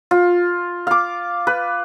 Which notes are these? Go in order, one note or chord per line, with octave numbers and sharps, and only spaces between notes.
F4
F5 D6
B4